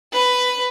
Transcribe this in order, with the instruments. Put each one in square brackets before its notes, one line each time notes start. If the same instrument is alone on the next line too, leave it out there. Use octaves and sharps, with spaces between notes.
[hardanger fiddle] B4